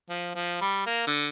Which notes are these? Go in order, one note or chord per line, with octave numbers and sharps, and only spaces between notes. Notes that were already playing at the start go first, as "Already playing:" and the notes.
F3
F3
G3
A#3
D3